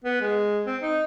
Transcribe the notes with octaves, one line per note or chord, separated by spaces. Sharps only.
B3
G#3
C4
D#4